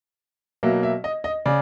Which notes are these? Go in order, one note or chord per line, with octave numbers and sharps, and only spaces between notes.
B2 F#3 A#3 E5
E5
D#5
D#5
C#3 D5